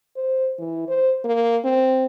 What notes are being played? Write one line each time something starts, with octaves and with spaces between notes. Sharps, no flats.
C5
E3
C5
A#3
C4